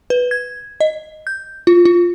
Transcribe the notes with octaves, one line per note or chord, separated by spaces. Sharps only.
B4
G#6
D#5
G6
F4
F4